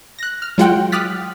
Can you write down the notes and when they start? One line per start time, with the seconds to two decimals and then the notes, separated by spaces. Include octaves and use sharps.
0.19 F#6 A#6
0.42 F6
0.58 F#3 G#3 F4 F#4 F#5 G5
0.92 D6 D#6 F6 F#6 A6 B6